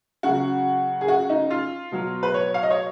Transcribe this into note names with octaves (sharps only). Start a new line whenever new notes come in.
C#3 F#3 F#4
G#4
F#4
D#4
F4
B2 F#3
B4
C#5
F5
D#5
C#5